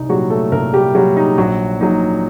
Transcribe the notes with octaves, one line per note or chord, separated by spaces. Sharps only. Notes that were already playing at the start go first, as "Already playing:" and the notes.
Already playing: C2 D#4
A#2 F#3 G3 F#4
A3 A4
C2 A#3 A#4
G3 G4
A#2 F#3 G3 F#4
D#4
A#1 F#3 F#4
A#2 F#3 D#4